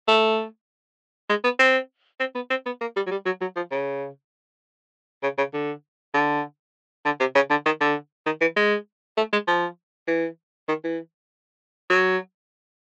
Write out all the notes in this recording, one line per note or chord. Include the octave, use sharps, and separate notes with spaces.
A3
G#3
B3
C4
C4
B3
C4
B3
A#3
G3
F#3
G3
F#3
F#3
F3
C#3
C#3
C#3
D3
D3
D3
C3
C#3
D3
D#3
D3
D#3
E3
G#3
A3
G#3
F3
E3
D#3
E3
F#3